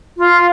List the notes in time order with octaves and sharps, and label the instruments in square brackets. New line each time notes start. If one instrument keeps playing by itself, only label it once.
[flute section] F4